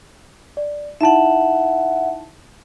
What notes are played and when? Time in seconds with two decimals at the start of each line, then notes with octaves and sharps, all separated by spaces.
0.57 D5
1.01 D#4 E4 E5 F#5 A5